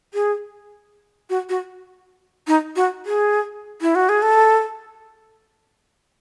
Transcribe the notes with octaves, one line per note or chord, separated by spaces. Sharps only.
G#4
F#4
F#4
D#4
F#4
G#4
E4
F#4
G#4
A4